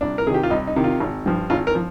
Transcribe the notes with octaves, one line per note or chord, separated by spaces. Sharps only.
C2 D4
A#4
C3 D#3 G4 G#4
F4
C2 D#4
D#4
C3 D#3
F4
G#1
G2 F3
G#1 F4
A#4
F3